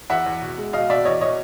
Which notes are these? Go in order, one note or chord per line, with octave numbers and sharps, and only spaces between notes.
E2 E5 F#5
E2
B2
G#3
B2 D#5 F5
B2 D5 E5
E2 C#5 D#5
B2 C#5 D#5